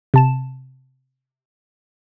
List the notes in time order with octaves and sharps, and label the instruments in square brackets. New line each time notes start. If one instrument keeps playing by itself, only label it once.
[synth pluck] C3 A5 E7